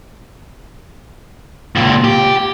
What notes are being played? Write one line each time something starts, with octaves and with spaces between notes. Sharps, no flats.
C#2 A#2
G4